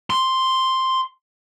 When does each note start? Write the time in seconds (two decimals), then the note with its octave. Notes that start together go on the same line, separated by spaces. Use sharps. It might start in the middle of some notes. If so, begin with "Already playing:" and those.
0.10 C6